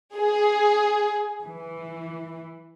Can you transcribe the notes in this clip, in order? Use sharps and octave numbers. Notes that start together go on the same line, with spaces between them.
G#4
E3